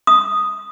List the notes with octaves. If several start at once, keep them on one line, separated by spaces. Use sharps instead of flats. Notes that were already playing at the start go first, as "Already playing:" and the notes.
D#6